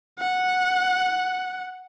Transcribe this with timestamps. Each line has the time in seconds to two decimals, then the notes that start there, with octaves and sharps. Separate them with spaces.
0.19 F#5